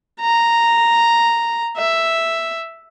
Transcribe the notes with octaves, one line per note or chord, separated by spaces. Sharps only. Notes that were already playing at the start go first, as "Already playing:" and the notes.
A#5
E5